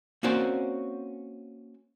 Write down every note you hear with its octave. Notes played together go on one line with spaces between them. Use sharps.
A#3 C4 C#4 F#4 C5 D5